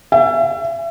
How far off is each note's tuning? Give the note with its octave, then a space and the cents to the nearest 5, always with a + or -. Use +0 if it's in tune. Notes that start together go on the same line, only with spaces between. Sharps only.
E5 +35